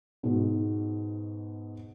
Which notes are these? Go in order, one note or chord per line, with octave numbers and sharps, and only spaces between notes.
G#2 B2